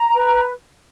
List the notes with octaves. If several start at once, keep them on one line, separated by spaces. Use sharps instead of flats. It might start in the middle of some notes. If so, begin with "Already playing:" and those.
Already playing: A#5
B4